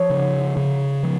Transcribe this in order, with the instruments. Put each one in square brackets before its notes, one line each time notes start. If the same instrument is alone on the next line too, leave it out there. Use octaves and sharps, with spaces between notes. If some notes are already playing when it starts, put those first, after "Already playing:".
Already playing: [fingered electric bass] F3 [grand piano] C#5
[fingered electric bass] C#3
C#3
F3